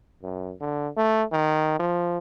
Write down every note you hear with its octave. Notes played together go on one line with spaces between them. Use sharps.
F#2
D3
A3
D#3
F3